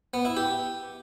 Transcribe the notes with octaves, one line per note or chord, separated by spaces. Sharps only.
B3
E4
G4